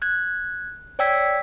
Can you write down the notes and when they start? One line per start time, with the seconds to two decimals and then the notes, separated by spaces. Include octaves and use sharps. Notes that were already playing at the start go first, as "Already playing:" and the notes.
0.02 F#6 G#6
0.99 C#5 D5 G5 E6 G#6 B6